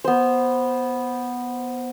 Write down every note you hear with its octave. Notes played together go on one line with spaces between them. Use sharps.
B3 C5